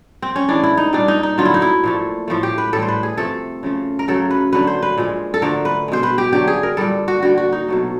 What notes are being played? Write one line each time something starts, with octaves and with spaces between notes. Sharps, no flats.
C4
C#4
A2 E3 G#3 D4
E4
D#4
A#2 G3 D4
D#4
D#4
D3 F#3 A3 F4
E4
D#4
E4
A#2 F3 A3
A2 F3 A3
G4
B4
A2 E3 G3 A4
C5
B4
G#4
C3 F3 A3 A4
C#3 F3 A3
A#4
C#3 F#3 A3 A4
B4
D3 F#3 A3 B4
C5
B4
A#2 F3 G#3
A4
D3 F3 A3 A#4
B4
B2 G#3 C5
B4
G4
D3 F#3 A3 G4
G#4
A#4
A#2 G3 A4
F#4
D3 G3 F#4
F#4
D#4
B2 F#3 A3